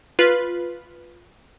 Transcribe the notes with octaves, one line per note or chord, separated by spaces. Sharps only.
F4 B4